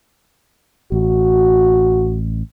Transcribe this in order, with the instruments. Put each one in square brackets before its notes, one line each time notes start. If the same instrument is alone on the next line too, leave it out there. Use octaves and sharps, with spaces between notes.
[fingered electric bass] A1 [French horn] F#4